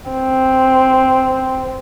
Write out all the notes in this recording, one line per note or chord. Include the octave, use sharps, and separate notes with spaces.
C4